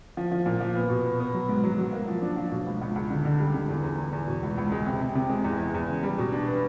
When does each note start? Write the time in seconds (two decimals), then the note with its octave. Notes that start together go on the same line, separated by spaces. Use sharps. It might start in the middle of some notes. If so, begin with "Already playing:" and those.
0.17 F3
0.32 F3
0.46 A#2
0.61 F3
0.75 B3
0.90 B2
1.05 B3
1.20 B3
1.34 F#3
1.49 G#2
1.64 F#3
1.78 F#3
1.93 A#3
2.08 F3
2.22 D4
2.37 F3
2.52 B2
2.66 C#2
2.81 C#2
2.96 C#2
3.11 D3
3.25 D3
3.40 G3
3.55 D3
3.69 E2
3.83 E2
3.98 E2
4.13 E2
4.28 B2
4.43 C#2
4.57 C#2
4.72 G#3
4.86 C3
5.01 C3
5.15 C3
5.30 G#3
5.44 E2
5.59 E2
5.74 E2
5.88 C#3
6.03 G3
6.18 B2
6.32 D4
6.48 B3